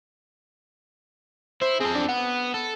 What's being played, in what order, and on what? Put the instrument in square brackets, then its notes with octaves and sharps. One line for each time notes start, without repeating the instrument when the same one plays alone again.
[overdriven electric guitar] E4 [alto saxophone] C5
[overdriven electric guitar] C4 A4 [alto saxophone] G#4
[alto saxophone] D4
[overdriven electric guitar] B3 [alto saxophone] F#5
[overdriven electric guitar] A4